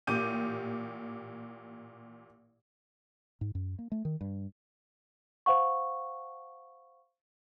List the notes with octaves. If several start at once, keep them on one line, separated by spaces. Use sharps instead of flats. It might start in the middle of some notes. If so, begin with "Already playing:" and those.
A1 A#2 G4 D6 G6 D#7
G#2
F#2
A#3
A3
D#3
G2
C5 F5 F#5 C#6